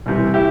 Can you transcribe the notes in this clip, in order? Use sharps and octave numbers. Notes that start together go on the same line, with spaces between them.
C2 C3 E3
E4 G4